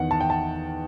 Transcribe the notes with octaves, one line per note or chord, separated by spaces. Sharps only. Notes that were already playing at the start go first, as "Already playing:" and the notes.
Already playing: E2 D#3 F#5
A5
G5
A5